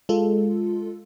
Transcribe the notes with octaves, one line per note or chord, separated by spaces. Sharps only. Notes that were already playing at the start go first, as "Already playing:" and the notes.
G#3 F4 A4